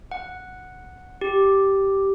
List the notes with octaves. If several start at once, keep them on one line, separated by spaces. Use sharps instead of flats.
F#5
G4